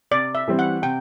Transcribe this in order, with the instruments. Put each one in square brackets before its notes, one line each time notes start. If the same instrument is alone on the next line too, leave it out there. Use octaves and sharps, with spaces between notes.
[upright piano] C3 [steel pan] D5
[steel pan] E5
[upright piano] E3 G3 C4
[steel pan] F#5
[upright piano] C3 [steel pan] G5